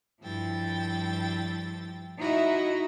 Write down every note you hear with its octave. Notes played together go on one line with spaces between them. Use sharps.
G2 F3 E4 G5 A6
D#4 E4 F#4 D#5 E5